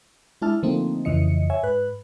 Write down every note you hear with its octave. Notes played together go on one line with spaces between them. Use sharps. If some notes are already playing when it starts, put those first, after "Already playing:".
G#3 D4 E4 A5 F6
D3 F3 A3 A#3 C4 D#4
F2 C#3 E3 D#5 C#7
C#5 E5 G#5
G#2 B4 F#6